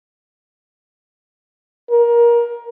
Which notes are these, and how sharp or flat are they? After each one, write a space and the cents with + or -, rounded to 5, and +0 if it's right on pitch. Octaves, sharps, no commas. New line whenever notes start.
A#4 +20